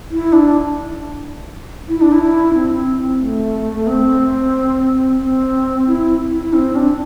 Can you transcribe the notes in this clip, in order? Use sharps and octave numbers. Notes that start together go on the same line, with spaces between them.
E4
D4
E4
D4
E4
C4
A3
A3
C4
C4
E4
E4
C4
D4